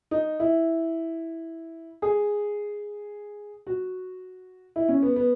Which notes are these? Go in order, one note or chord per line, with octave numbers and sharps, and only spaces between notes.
D#4
E4
G#4
F#4
E4
C#4
B3
B3